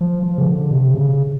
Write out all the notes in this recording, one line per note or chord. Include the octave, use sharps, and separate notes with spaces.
F3
F3
C#3
D3
C3
C#3